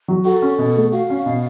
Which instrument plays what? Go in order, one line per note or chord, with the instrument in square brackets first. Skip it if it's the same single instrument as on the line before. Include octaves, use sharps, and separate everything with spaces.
[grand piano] F#3
[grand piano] F#4 [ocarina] A4
[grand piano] C#4
B2
A3
[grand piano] F#4 [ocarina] F5
[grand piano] C#4
B2